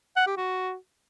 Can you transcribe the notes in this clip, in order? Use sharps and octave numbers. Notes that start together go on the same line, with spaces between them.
F#5
G4
F#4